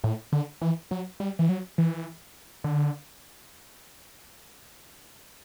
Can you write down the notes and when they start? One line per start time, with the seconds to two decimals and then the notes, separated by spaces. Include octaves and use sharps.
0.04 A2
0.32 D3
0.62 E3
0.91 F#3
1.20 G3
1.39 E3
1.49 F#3
1.78 E3
2.64 D3